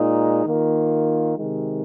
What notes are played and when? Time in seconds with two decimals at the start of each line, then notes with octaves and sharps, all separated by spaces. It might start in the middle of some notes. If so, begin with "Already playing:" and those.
Already playing: A#2 G#3 D#4
0.45 D#3 A#3 F4
1.36 C3 D#3 G#3